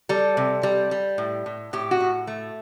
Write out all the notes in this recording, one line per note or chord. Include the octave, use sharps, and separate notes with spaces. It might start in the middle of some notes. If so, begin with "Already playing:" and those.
G3 A4
C3
G3
G3
A2
A2
A2 G4
F#4
A2
A3